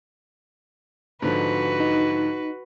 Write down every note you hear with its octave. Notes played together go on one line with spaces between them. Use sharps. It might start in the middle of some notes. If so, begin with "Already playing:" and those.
G#2 D3 F3 F#4 B4
D#4